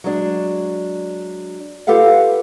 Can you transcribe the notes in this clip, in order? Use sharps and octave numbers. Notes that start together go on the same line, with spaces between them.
F#3 G#3 D4
F4 G4 A4 B4 F5 F#5